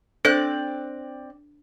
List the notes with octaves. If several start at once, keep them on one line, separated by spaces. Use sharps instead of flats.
C4 D4 A4 C5 D5 F#6